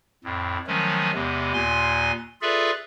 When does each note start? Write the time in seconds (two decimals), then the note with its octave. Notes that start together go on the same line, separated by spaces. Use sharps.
0.24 F2 A2
0.67 D#3 F3 F#3 G#3 A3 C#4
1.14 E2 C3 G#3 B3
1.53 D#2 A#2 G#5 C6
2.42 F4 G#4 A4 B4 D5 E5